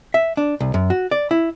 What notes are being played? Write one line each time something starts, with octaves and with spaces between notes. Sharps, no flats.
E5
D4
C2
F#2
F#4
D5
E4